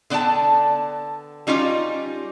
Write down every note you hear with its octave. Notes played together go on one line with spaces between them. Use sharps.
D3 B3 D5 G5 A5
G3 C#4 D#4 F4 G4